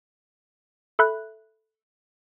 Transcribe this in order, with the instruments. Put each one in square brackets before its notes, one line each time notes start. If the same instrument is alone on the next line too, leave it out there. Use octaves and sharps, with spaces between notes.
[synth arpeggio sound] A4 E5 B5 F#6